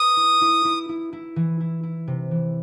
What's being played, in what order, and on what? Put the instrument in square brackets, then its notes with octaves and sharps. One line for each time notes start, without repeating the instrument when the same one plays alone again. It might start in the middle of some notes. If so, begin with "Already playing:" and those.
Already playing: [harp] B4 [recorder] D#6
[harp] E4
E4
E4
E4
E4
E3
E4
E4
C3
E3